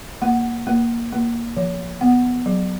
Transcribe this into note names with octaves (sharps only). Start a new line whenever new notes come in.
A#3 F#5
A#3
A#3
F3
B3 F#5
F#3